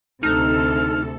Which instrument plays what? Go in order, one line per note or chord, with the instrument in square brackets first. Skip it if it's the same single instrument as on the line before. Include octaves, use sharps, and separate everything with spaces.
[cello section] D2 C3 [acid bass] D#4 [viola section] A4 [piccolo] F6